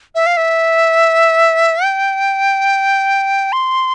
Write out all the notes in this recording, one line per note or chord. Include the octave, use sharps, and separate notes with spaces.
E5
F5
E5
G5
C6